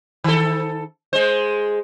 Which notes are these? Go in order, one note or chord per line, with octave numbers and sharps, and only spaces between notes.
D#3 A4
G#3 C5